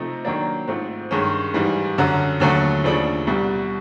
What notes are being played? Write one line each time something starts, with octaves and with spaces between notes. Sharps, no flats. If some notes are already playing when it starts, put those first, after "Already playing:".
Already playing: C3 F3 A3 C4 D#4
D#3 F#3 A#3 D4
G#2 F3 A3 C4
G2 D#3 G#3 C#4
G#2 E3 G3
F#2 D3 F#3
D#2 D3 F#3 A3
D#2 C#3 F3 A3 D4
C2 B2 G3